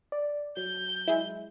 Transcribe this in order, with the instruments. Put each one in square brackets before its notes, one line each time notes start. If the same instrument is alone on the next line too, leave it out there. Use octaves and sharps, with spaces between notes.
[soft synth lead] D5
[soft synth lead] F#3 [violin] G6
[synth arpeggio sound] G#3 E4